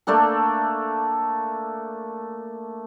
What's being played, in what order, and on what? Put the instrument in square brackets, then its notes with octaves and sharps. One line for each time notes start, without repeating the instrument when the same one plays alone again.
[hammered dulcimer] A3 A#3 D4 A4